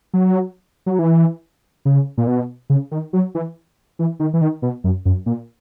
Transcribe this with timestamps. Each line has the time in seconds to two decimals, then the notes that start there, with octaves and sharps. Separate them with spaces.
0.13 F#3
0.86 F#3
0.99 E3
1.85 C#3
2.18 A#2
2.27 B2
2.70 C#3
2.91 D#3
3.13 F#3
3.35 E3
3.99 E3
4.20 D#3
4.33 E3
4.41 D#3
4.62 B2
4.84 F#2
5.05 F#2
5.26 A#2